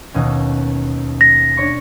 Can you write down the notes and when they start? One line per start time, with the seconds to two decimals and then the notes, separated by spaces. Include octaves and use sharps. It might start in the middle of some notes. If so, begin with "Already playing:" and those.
0.14 D#2 B2 C#4
1.21 A#6
1.57 D4 C#5 C#6